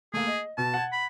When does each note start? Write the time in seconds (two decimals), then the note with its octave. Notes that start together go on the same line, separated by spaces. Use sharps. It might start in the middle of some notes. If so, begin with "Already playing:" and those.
0.14 A3 A#3 G#4
0.27 D#5
0.58 B2 A5
0.74 F#5 G#6
0.92 B5